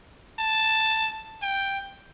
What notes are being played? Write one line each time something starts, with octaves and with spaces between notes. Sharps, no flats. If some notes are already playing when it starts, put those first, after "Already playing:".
A5
G5